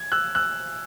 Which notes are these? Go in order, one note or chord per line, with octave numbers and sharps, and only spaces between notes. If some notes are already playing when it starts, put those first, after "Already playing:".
Already playing: G#6
E6 F#6
E6 F#6